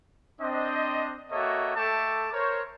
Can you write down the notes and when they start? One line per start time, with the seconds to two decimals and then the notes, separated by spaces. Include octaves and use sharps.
0.41 C4 D4 D#5
1.31 A#3 F#4 A4 C#5 D#5 E5
1.76 A3 A4 E5 G5 A5 D6
2.32 A#4 C5 C#5